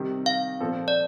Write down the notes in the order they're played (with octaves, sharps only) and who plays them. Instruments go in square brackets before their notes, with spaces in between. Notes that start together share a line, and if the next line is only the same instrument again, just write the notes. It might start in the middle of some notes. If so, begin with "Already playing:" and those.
Already playing: [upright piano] C3 D#3 G3
[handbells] F5
[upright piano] A#2 F3 C4 F4 A4
[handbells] D5